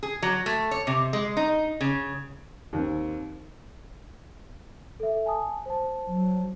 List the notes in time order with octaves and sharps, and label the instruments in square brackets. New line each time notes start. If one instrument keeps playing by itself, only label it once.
[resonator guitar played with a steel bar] G#4
F#3
A3
C#5
C3
G#3
D#4
C#3
[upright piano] D#2 C4
[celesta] A4 E5
G#5 A5 D#6
C5 A5
[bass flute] F#3